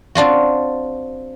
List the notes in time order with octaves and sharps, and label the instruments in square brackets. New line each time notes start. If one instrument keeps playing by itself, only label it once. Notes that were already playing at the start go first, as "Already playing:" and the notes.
[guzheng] C4 D4 F4 F#4